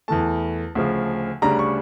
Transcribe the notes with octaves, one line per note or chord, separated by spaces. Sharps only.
E2 E3 A3 A5
D2 C#3 F3
D2 C#3 G3 D4 A#5
C#6